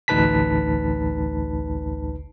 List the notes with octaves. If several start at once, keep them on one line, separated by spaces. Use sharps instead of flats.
A1 D2 D#4 B4 A5 B6